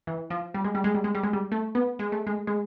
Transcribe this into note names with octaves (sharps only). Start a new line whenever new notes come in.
E3
F3
G3
G#3
G3
G#3
G3
G#3
G3
G#3
G3
A3
B3
G#3
A3
G#3
G#3